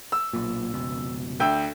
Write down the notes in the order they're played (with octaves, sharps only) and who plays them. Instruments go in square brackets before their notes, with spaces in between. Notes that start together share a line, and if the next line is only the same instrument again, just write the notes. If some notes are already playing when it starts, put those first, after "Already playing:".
[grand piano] E6
[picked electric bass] B1 A#2
F1 C#2 B2
[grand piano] D2 G5 E6